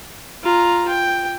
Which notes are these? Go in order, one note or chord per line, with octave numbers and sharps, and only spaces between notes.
F4 A#5
G5